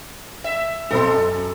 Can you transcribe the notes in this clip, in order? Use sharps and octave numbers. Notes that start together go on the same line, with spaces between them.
E5
B1 C4 A4 C6
F#2